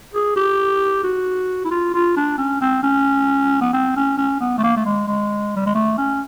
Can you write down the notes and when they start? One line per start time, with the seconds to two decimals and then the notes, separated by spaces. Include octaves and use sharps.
0.14 G#4
0.36 G4
1.03 F#4
1.65 E4
1.71 F4
1.94 F4
2.17 D4
2.38 C#4
2.61 C4
2.83 C#4
3.61 B3
3.73 C4
3.96 C#4
4.18 C#4
4.41 B3
4.58 A3
4.63 A#3
4.77 A3
4.85 G#3
5.07 G#3
5.56 G3
5.66 G#3
5.75 A3
5.98 C#4